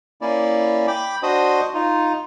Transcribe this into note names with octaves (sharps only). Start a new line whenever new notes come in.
A#3 C#4 E4 D5
G5 B5 D6
D4 F#4 C5 D#5 D#6
D#4 F4